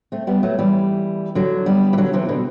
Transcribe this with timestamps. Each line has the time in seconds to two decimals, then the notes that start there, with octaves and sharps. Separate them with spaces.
0.12 A3 C4
0.27 G3 B3
0.43 F#3 A3
0.59 E3 G3
1.35 D3 F#3
1.66 G3 B3
1.93 E3
1.98 D3 F#3
2.13 C3 E3
2.29 B2 D3